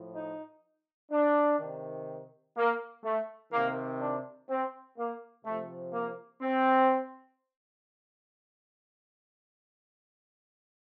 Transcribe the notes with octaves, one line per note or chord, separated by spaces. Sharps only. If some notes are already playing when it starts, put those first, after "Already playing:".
Already playing: A2 F3
D#4
D4
C3 D#3
A#3
A3
C3 D#3 A#3
D4
C4
A#3
C3 F3 A3
A#3
C4